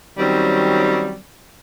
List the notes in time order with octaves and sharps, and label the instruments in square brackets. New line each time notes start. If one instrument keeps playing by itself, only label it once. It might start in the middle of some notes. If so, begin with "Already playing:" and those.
[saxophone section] D#3 F#3 G3 C4 C#4